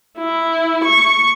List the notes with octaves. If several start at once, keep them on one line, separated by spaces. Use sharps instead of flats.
E4
C#6